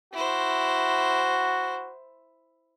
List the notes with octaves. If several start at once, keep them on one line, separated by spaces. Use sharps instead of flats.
E4 F#4 C5